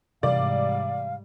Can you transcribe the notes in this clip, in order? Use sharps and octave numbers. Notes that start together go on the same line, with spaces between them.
G#2 C3 E3 G3 D5 F5